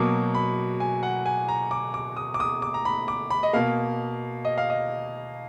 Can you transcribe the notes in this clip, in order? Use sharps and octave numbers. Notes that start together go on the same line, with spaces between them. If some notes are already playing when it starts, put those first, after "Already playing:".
Already playing: B2 F#3 A#3 D6
B5
G#5
F#5
G#5
A#5
D6
D6
D#6
D6
D#6
D6
A#5
B5
D6
B5
D#5
B2 A#3 F5
D#5
F5
D#5